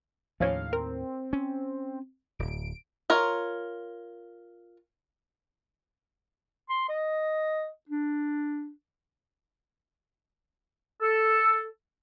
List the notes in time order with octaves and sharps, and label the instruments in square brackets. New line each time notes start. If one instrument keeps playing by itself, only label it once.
[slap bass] D#2 A2 [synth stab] F3 C#4 [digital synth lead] F5
[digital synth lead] C4 [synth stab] A#4
[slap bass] C#4
[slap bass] D1 [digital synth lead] D7
[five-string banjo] F4 A#4 C#5
[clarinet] C6
D#5
D4
[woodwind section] A4